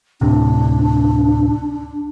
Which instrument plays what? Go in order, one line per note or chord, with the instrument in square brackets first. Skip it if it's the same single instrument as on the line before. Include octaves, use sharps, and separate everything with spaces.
[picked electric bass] D2 A2 C3 [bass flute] D4